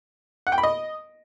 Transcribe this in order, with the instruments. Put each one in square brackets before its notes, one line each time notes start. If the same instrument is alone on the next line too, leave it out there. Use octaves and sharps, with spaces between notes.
[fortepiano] F#5
G5
B5
D#5